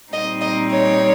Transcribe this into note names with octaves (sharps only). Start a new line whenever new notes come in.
A#2 G3 C4 D#4 D#5
D#5
C#5